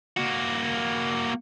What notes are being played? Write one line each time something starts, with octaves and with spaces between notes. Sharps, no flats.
A#3 F#4